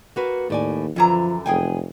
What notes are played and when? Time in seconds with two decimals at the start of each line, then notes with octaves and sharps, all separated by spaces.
0.16 A#3 F#4 B4
0.50 D#2 A2 D5 G#5
0.96 F#2 D3 E3 F3 A#5
1.46 F1 G#4 G5 G#5